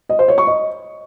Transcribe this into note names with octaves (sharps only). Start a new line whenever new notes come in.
D#5
C5
C#5
C#6
D#5